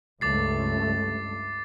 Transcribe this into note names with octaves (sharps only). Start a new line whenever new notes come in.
C#2 G2 A3 D6 A6 C7